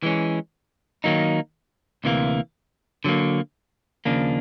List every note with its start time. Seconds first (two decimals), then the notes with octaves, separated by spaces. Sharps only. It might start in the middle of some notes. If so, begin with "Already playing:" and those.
0.03 E3 G#3 C#4
1.04 D#3 F#3 A#3 D#4
2.04 D2 C3 E3 G3 A#3
3.04 D3 F#3 A#3
4.05 D#2 C#3 F3 A#3 D4